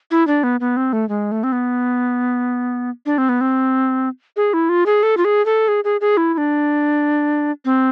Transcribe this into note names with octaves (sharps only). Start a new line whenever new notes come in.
E4
D4
B3
B3
C4
A3
G#3
A3
C4
B3
D4
C4
B3
C4
G#4
E4
F4
G#4
A4
F4
G#4
A4
G#4
G#4
G#4
E4
E4
D4
C4